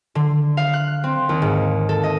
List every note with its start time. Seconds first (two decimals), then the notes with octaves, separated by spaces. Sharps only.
0.15 D3
0.57 F5
0.73 F#6
1.04 C4
1.29 D#2
1.42 G#2
1.89 A4
2.03 D#5